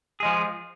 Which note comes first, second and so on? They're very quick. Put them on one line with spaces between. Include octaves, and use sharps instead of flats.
G#4 G#3 F3